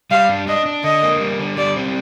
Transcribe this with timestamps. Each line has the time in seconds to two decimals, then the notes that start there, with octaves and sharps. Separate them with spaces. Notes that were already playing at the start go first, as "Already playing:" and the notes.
0.11 G3 F5
0.29 D4
0.48 D4 D#5
0.66 D4
0.84 D3 D#5
1.02 A#3
1.20 G3
1.39 D3
1.58 G3 D5
1.76 C4